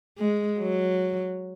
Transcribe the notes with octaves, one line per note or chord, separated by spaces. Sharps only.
G#3
F#3